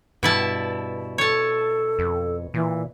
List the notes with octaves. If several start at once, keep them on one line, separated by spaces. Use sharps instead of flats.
G2 B2 E4 A5
A4 C#5 A5
F2
A#2 E3